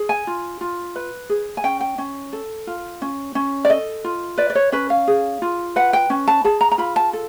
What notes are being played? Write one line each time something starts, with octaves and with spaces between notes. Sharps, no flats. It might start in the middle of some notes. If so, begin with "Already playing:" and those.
Already playing: G#4
G#5
F4
F4
B4
G#4
G#5
C#4 G5
G5
C#4
A4
F4
C#4
C#4
D5
A4 D#5
F4
B4 D5
D5
C#5
C#4 B4
F5
G#4
F4
B4 F#5
G5
C#4
A5
G#4 A5
A#5
A#5
F4 B5
A5
A4